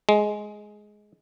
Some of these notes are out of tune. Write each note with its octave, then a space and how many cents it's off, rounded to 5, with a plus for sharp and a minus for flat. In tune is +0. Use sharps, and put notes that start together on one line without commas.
G#3 +10